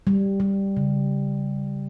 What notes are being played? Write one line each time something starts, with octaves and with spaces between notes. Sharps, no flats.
G3
G3
C#3